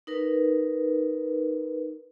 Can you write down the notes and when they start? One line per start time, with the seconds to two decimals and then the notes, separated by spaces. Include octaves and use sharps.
0.07 D#4 A#4 B4